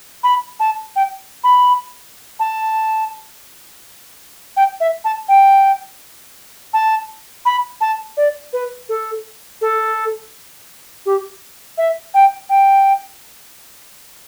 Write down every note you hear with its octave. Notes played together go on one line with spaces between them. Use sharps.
B5
A5
G5
B5
A5
G5
E5
A5
G5
A5
B5
A5
D5
B4
A4
A4
G4
E5
G5
G5